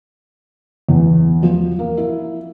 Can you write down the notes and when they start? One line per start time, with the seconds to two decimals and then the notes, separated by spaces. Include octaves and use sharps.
0.89 E2
1.43 F3
1.79 A#3
1.97 E4